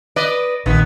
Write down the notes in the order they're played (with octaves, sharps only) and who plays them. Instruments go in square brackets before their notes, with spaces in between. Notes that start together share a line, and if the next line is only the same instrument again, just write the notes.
[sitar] B4 D5 D#5
[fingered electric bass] A#1 [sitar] C3 D#3 B3